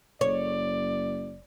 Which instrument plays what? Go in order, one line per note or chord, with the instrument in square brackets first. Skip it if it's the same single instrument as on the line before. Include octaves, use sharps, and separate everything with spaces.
[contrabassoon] F#1 [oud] C#5 [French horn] D5